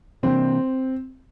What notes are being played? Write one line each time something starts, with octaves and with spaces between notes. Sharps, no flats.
C3 E3 G3 A#3 C4 D4